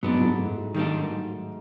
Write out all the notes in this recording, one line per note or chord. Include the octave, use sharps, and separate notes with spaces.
G#2 F#3 G#3 B3 D4
G#2 G#3
A2 A3
F#3
D#3 G3 A#3 D4
F#3